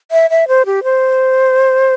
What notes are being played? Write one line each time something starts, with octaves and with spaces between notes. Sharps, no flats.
E5
E5
C5
G4
C5